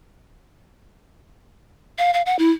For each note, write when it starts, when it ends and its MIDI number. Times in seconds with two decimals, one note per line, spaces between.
1.98 2.13 77
2.14 2.22 77
2.26 2.36 78
2.39 2.51 64